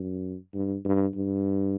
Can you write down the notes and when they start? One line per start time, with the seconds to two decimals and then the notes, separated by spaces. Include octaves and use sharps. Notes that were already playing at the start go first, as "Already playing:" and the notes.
Already playing: F#2
0.54 G2
0.85 G2
1.15 G2